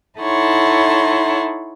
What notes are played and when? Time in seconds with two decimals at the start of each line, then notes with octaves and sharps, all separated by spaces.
0.19 D#4 E4 A4 C#5 F#5 C6